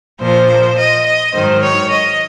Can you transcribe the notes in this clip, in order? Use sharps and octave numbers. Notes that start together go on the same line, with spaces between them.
A#2 F3 C5
D#5
D#5
G#2 D#3 F#3 C5
C#5
D#5